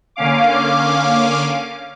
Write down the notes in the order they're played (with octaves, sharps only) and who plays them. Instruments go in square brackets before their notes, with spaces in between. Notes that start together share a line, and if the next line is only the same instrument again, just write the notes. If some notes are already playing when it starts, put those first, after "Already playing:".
[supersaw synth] D3 A#3 C#4 F5 D6